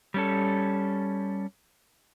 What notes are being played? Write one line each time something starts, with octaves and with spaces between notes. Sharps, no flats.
G3 C#4 A4